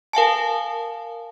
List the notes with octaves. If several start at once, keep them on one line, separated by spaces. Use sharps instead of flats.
A#4 F5 G#5 A5